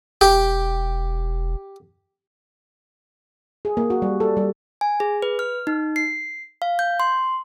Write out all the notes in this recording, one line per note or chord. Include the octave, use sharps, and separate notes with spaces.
E1 G4
G#4
A#3
F#4
G3
A4
G3
G#5
G#4
B4
F6
D#4
C7
F5
G6
C6